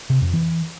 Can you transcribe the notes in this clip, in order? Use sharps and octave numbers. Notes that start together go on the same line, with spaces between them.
C3
F2
E3